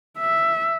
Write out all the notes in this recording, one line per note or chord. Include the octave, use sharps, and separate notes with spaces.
E5